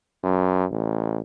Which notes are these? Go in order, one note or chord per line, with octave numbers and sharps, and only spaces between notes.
F#2
A1